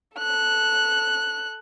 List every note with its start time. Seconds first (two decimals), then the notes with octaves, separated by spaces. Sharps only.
0.17 A4 F#6